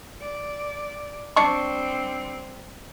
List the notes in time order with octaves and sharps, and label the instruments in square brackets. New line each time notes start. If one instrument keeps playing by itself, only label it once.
[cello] D5
[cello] G3 C4 [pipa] D4 C#6